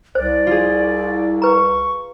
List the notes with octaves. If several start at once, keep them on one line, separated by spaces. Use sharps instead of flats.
C2 C5 D5
F4 G#4
B4 A#5 C#6